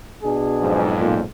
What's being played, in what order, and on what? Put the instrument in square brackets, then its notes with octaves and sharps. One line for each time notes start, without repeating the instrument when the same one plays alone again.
[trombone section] B2 D4 G#4
[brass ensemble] B1 F2 G#2
[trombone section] A#2